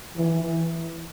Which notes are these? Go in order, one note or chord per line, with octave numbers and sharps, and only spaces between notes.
E3